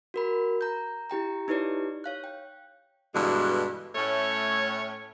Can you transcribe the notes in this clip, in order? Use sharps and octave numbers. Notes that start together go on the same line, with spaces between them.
F#4 A#4 B5
A#5 G6
E4 G4 G5 A#5
D#4 E4 G4 B4 C#5 D5
C#5 F5 F#6
G5
G2 B2 D3 E3 G#3
A2 A3 C#4 C#5